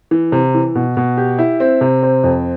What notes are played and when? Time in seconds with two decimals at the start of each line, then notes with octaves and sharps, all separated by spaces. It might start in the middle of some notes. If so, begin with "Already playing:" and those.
0.11 E3
0.32 C3
0.54 E3
0.75 B2
0.97 B2
1.17 G4
1.39 E4
1.60 C4
1.81 C3
2.03 C4
2.24 F2